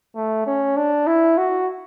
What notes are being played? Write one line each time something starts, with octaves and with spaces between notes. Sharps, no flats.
A3
C#4
D4
E4
F#4